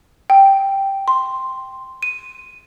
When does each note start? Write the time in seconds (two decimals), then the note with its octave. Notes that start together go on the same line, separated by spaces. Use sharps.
0.30 G5
1.08 C6
2.03 D#7